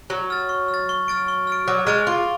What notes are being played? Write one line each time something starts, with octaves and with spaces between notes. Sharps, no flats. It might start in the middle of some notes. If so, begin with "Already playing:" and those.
F#3 C#6
F6 A6
C#6
F6
A6
C#6
F6 A6 D7
C#6
F6 A6 D7
F#3 D6
G#3 F6 A6 D7 F7
F4 D6